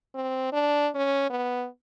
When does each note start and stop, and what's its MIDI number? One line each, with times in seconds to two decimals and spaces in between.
0.15 0.51 60
0.52 0.89 62
0.95 1.29 61
1.30 1.67 59